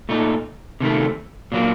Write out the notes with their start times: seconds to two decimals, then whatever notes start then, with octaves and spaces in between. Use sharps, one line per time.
0.09 A#2 A3 D#4
0.80 C3 D#3 A3
1.52 A#2 F#3 A#3